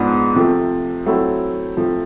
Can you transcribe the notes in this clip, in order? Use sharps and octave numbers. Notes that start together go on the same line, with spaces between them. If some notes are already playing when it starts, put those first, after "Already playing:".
Already playing: G#2 F3 G#3 B3 D4
C3 F3 A3
F#3 A3 C4 E4
C3 F3 A3